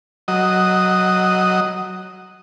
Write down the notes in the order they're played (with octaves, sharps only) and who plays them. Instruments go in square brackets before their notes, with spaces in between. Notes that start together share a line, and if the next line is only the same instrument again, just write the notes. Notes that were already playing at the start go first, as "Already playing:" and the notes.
[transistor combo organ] F#3 D#5